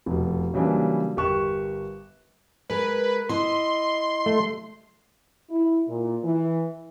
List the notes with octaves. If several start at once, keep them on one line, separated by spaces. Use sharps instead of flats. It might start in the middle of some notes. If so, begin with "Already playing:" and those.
F1 B2
C#3 E3 F#3 G3 A#3 D4
G1 G4 A#4 C#6 F#6 E7
G#3 A#4 B4
E4 D#5 C6
A3
E4
A#2
E3